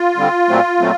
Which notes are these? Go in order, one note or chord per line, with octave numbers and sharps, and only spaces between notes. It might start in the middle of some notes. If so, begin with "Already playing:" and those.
Already playing: F4
D3 G3 C4
A#2 F#3 A3 C4
A#2 F#3 A3 C4